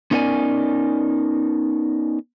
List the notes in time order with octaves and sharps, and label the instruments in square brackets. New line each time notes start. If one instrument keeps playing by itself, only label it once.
[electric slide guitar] B3 C#4 D#4 A#4 D5 G#5